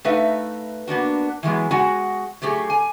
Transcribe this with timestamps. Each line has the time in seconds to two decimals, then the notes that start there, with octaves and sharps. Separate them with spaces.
0.04 A3 D#4 B4 E5 F5
0.87 A#3 B3 D4 F#4
1.43 E3 F#3 G#3 B3
1.71 G#3 F#4 F#5 G#5
2.42 F#3 A3 G4 G#4
2.70 G#5